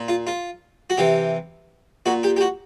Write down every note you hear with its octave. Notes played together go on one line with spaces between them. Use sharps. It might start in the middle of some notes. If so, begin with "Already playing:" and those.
Already playing: A#2
F4
F4
F#4
C3 E3 G4
A#2 F#4
G4
G4
F#4